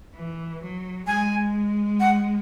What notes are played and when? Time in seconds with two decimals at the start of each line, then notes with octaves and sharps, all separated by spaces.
0.15 E3
0.61 F#3
1.07 G#3 G#5
2.00 F#5